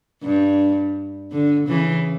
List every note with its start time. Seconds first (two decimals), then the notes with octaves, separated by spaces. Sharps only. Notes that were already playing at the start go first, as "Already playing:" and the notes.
0.23 G2
1.31 D3
1.68 C#3 E3